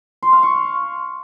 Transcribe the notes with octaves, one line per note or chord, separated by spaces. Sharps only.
C6
F5
C#6